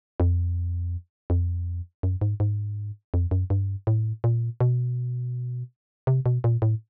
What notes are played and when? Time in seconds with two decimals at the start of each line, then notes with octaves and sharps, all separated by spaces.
0.20 F2
1.30 F2
2.03 F#2
2.21 G#2
2.40 G#2
3.14 F2
3.31 F#2
3.50 G2
3.87 A2
4.24 A#2
4.60 B2
6.07 C3
6.26 B2
6.44 A#2
6.62 A2